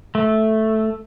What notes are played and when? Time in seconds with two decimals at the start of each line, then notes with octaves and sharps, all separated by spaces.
0.15 A3